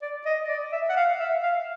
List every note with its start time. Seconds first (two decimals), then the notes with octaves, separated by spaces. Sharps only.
0.02 D5
0.26 D#5
0.49 D5
0.73 E5
0.89 F#5
0.97 F5
1.20 E5
1.43 F5